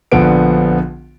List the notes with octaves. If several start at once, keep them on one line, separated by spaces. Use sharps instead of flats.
A#1 D3 F3 B3 D7